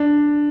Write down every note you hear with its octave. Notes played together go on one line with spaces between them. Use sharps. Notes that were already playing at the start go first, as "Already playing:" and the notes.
Already playing: D4